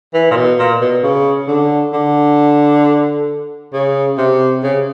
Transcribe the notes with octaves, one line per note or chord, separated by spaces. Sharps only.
E3
A#2
B2
A#2
B2
C#3
D3
D3
C#3
C3
C#3